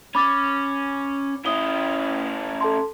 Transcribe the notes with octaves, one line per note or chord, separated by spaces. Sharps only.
C#4 B5 D6 A6
C#4 E4 D#6 G7
A4 A5 C6